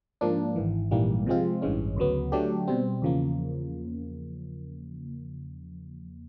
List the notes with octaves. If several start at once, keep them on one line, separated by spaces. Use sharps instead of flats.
G#2 F3 A#3 D4
G#1 G#2 E3
A#1 G#2 E3 G3 A#3
C3 F3 G#3 C4 F4
A1 G2 E3 G#3 C#4
D2 C#3 F#3 B3
D3 F#3 A3 D4 G4
B2 G3 C4
E2 C#3 F3 A#3